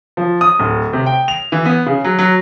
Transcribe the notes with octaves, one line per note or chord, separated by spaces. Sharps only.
F3
D#6
D1
C3
G5
F7
E3
B3
C#3
F#3
F#3